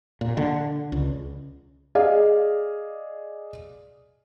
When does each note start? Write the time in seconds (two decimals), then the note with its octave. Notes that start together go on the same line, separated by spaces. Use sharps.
0.21 A#2
0.37 D3
0.92 C#2
1.95 G#4 D5 D#5 F5